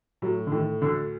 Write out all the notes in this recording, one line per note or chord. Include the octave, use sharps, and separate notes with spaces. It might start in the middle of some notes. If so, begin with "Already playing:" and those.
A2 F#3
D3
A2 D#3
D2 D3